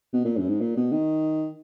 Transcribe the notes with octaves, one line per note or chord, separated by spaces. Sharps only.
B2
A#2
F#2
G#2
A#2
B2
D#3